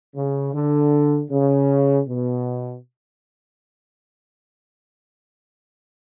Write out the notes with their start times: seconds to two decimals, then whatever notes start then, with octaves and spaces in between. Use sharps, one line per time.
0.15 C#3
0.53 D3
1.30 C#3
2.06 B2